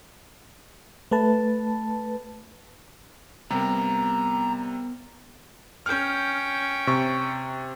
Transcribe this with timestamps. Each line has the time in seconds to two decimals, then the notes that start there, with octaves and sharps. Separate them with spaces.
1.11 A3 B4 A5
3.51 C3 G3 B3 A#4 A#5
5.86 C#4 G5 F6 G6
6.87 C3 C#6